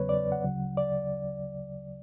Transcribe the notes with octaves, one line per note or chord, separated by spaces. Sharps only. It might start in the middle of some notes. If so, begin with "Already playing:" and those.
Already playing: E2 C#3 F#3 B3 B4 C#5
D5
F#5
D2 C#3 F#3
D5